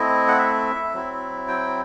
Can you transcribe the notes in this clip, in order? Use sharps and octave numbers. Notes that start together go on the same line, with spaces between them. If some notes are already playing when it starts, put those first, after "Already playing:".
Already playing: A3 C4 E4 D#5
F#5
E5
F#3 C4 E4
G5